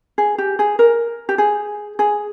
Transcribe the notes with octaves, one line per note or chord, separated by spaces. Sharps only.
G#4
G4
G#4
A#4
G4
G#4
G#4